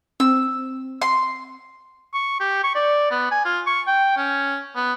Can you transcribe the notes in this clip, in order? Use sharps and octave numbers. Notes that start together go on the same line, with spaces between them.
C4 E6
C6
C#6
G4
C#6
D5
B3
G#5
F4
C#6
G5
C#4
B3